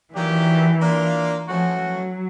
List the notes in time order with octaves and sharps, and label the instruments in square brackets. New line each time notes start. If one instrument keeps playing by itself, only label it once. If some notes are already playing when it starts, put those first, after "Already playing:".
[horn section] D#3 F#3 A#3 D4 G4 [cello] E3
[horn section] A#3 D4 F4
[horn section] E3 A3 C#4 F#4 [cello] F3
[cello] F#3